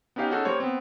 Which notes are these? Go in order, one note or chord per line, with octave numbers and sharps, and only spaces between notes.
B3 C#4 D#4 G4 F5
C#4 D#4 F#4 G#4 A4
G3 A#3 C5 C#5
B3 C4